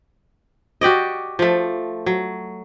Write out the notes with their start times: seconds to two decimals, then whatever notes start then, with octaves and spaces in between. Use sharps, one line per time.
0.81 F#4 G4 D5 D#5
1.39 F3 A3
2.06 F#3